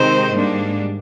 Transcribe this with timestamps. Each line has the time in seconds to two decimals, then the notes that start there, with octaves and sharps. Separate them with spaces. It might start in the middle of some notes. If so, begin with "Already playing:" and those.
Already playing: C3 D#3 G#3 C4 D#4 C5
0.32 G#2 G3 A#3 D4